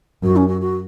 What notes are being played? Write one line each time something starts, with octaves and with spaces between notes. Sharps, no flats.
F#2 F#4
C#4
F#4
F#4